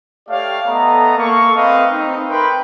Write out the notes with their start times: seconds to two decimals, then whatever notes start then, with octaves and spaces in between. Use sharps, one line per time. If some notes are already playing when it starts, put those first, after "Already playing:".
0.29 A3 G4 C#5 D5 F5
0.67 A3 B3 A4 D#5 A#5
1.18 A#3 A4 C#6
1.55 A3 C4 B4 D#5 F5
1.92 C4 D#4
2.29 A3 A#4 B4 G5 B5 C6